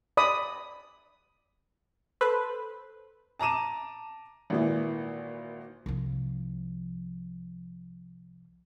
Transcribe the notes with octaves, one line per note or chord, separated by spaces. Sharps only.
D5 B5 D#6
A4 B4 C5
A5 A#5 D6 D#7 E7
G#1 A#2 E3
C2 F3